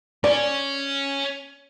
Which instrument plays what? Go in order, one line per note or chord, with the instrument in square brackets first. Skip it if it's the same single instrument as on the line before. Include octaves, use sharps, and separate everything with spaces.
[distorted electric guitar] C#4 [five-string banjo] D5